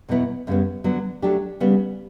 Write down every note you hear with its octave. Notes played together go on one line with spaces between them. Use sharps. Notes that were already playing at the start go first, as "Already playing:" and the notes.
E2 B2 F#3 B3 E4
F#2 C#3 G3 B3
D3 F#3 B3
F#3 A3 D4 G4
C#3 G3 B3